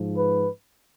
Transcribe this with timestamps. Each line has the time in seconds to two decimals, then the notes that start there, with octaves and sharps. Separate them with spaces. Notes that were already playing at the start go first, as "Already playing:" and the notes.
Already playing: G#2 F3
0.16 B4